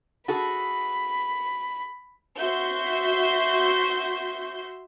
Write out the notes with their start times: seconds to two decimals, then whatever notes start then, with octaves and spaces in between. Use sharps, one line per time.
0.28 F#4 G#4 A4 B5
2.39 F#4 E5 C6 G6